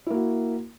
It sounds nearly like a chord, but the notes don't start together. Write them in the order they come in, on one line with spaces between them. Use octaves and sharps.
E4 A#3 F#4